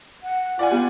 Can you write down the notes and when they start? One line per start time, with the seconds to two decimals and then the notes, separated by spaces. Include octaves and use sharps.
0.23 F#5
0.59 F4 D5 F#5 G#5
0.71 B3 F4 G4